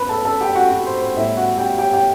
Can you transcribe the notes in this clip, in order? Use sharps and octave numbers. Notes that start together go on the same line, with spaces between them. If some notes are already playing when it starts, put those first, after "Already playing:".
Already playing: B3 B4 B5
A4 A5
A4 A5
G4 G5
F#4 F#5
F#4 F#5
C5 C6
C5 C6
A2 G3 B3 E4 E5
F#4 F#5
G4 G5
G4 G5
G4 G5